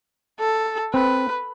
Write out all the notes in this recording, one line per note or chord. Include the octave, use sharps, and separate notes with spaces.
A4
C4 B4